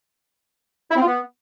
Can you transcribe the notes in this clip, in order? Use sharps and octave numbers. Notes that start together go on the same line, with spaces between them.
E4
C4
F4
B3